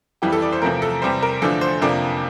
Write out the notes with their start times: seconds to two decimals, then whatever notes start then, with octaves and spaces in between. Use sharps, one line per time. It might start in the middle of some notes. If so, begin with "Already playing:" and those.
0.22 F2 E3 G3 G4
0.33 A4
0.42 D5
0.52 C5
0.62 E2 C3 F3 A3 A#4
0.82 A4
1.02 E2 C3 G3 C5
1.22 A#4
1.42 E2 D3 F3 A3 D4 A4
1.61 C5
1.81 F2 C3 F3 A#3 D4 D5